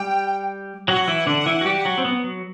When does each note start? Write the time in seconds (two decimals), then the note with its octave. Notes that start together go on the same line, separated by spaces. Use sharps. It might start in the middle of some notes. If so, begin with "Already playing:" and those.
Already playing: G3 G4 G5
0.88 F#3 F#4 F#5
1.08 E3 E4
1.27 D3 D4
1.46 E3 E4
1.61 F#4
1.65 G3 G4
1.85 F#3 F#4
1.98 C4
2.05 B3
2.24 F#3